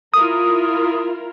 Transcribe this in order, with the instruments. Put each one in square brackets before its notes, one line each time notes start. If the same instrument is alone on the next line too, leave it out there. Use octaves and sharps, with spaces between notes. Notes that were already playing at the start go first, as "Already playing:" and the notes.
[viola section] E4 F4 A#4 [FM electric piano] D#6